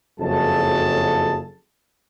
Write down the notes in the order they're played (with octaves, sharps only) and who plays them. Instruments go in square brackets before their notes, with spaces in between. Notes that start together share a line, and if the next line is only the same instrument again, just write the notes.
[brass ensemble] F#1 F2 F#3 G#4 A4 A5